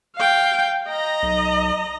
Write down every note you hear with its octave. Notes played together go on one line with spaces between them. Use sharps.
F5 G5
D#5 A#5
B1